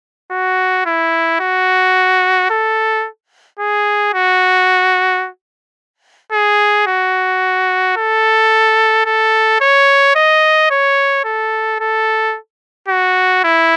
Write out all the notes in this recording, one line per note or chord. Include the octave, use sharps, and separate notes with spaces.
F#4
E4
F#4
A4
G#4
F#4
G#4
F#4
A4
A4
C#5
D#5
C#5
A4
A4
F#4
E4